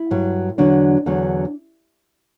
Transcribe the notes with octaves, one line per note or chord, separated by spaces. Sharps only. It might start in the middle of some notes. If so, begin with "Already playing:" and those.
Already playing: E4
G2 F#3
E2 D3 F#3 D4
E2 D3 F#3